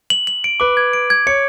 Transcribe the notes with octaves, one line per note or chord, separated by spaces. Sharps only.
F#7
F#7
D7
B4 D6
G#6
D7
G#6
C#5 C#7